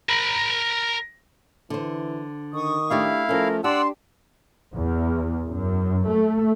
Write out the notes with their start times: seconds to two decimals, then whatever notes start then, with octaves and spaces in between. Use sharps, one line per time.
0.09 A#4 B5
1.70 D3 E3 C5
2.54 D#3 C#6 D#6
2.90 A3 D4 E4 G4 F5
3.29 F3 A3 C#4 A#4
3.64 D4 G4 D5 F#5 A5 C6 E6
4.73 E2
5.47 F#2
6.08 A3